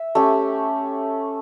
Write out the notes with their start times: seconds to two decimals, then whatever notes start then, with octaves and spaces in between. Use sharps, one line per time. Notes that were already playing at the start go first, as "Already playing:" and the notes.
Already playing: E5
0.15 A3 C#4 G4